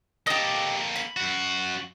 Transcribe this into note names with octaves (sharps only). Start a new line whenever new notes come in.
A#3 G4 A4 D#5
B5
F#2 F#4